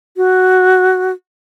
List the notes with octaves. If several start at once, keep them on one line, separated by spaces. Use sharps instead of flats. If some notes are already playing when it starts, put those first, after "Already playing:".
F#4